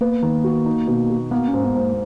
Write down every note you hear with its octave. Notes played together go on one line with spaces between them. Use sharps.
A#3 B3
D#3
F#4
D#4
B2
F#4
A#3 B3
C#4
G#2
B3
G#2
A#3